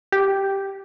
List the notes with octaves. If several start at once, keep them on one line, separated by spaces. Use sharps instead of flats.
G4